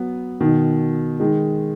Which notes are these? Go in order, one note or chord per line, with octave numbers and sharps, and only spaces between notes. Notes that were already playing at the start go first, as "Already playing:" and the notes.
Already playing: F#3 B3
B2 D#3
D#3 G#3